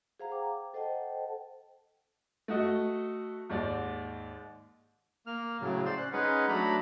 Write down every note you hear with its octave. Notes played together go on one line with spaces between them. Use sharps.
G#4 C5 F5 F#5 A#5
G5 D6
A4 C5 D#5 F#5 G5 A5
A3 F#4 D#5
D#2 G#2 D5
A#3 F6
A2 C#3 F#3
C5 D5 C6
C#4 F#6
G#3 C#4 D#4 G#4 B4 F#5
F#3 A3 D4 A#5 B5